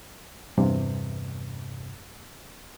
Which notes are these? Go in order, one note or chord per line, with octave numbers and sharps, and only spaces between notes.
E2 G2 C3